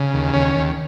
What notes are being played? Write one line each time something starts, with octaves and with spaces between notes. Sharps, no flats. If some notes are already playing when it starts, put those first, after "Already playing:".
Already playing: C#3
D#2
D#2 C#4
D#2